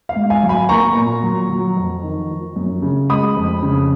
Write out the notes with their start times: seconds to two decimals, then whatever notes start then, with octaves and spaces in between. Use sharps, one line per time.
0.09 F5
0.16 G#2
0.30 F5 G#5
0.43 F#3
0.49 G#5 B5
0.69 A#3 A#5 C#6
0.96 A#2
1.23 F#3
1.50 F#3
1.77 F2
2.03 D#3
2.30 F3
2.56 F#2
2.82 C#3
3.10 G#3 B5 D#6
3.37 F2
3.63 C#3